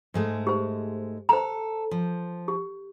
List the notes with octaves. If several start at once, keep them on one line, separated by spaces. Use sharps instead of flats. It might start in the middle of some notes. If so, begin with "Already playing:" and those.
G#2 G#3 A3
G4 C5
A4 C5 A#5
F3
G4